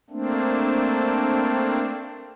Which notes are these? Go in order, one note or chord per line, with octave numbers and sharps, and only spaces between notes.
A3 A#3 C4 D4